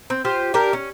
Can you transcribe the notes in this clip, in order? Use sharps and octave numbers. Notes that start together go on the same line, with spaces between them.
C4
F4 G4 C5
D4 G4 A#4
C#4